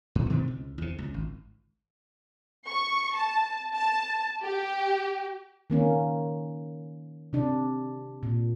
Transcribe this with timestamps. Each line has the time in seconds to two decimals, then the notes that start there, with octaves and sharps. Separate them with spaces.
0.15 G2
0.30 B2 D#3 A3 C4
0.48 C#2
0.78 E2 C3
0.98 C#2
1.14 G#1
2.68 C#6
3.15 A5
3.74 A5
4.43 G4
5.70 D#3 A#3 C#4
7.33 C3 D4
8.23 A#2